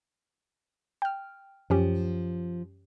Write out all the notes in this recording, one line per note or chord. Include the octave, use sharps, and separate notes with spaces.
G5 F6
F#2 F3 C#4 G4